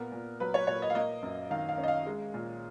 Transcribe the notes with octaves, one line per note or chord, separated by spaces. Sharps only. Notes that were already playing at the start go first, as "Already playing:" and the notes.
Already playing: A#2 B3 A#4
A#2
F#3 B4
C#5
A#2 C#5
D#5
F5
A#3 D#5
F#2
D#3 F5
F5
C#4
D#5
F5
G#3
A#2